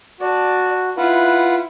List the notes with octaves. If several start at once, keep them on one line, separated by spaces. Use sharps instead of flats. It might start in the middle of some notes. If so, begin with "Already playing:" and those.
F#4 D5 A5
E4 F4 B4 F#5